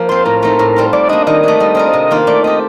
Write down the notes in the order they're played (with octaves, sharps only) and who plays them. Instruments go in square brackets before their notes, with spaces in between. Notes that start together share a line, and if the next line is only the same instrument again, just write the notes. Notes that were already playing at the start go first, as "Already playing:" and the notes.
Already playing: [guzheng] F3 A#3
[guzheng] C4 F4 [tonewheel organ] C5
[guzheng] A2 [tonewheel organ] A#4
[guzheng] A3 C4 D#4
A2
G3 C4 F4
[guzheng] G3 [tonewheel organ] D5
[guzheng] A#3 D4 [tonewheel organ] D#5
[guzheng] D#3 [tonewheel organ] D#5
[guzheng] A3 D4
G3
C4 F4 A#4
C3
D#3 A#3 F4
[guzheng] A3 [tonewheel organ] D5
[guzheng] C4 G4 [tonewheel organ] D#5